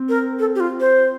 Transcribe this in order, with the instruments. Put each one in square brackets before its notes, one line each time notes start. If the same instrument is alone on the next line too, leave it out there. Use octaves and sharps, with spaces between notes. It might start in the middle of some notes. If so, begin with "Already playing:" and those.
Already playing: [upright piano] C4
[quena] A#4
A4
G4
F4
C5